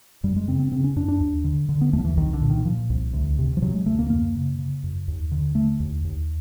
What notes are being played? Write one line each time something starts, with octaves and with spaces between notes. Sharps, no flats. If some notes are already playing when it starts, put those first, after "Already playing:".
F#2 G3
G#3
C#3 C4
C4
C#3 C4
C#4
F#2 D4
D4
D#2
D3
D3
B3
D#2 A3
F3
E3
C2 D#3
D3
A#2
D#3
A#2 F3
C2
D2
C3
F3
C3 F#3
G#3
D2 A3
A#3
F#2 A#3
C#3
C#3
F#2
D#2
D3
D3 A3
D#2
D#2